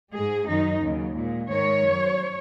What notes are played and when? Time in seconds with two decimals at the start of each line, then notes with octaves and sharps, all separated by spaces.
0.12 G#2 G#3 G#4
0.47 F#2 D#3 F#3 D#4
0.81 D#2 C#3 F#3
1.15 A#2 G#3
1.48 G#2 D#3 G#3 C#5
1.83 F#2 F#3